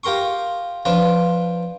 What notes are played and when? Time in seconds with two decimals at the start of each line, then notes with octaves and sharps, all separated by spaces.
0.04 F4 G4 A#4 C6 C#6
0.85 F3 D4 F4 B4